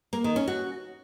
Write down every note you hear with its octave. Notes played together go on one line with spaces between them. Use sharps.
A#3
D#3
C#4
F#4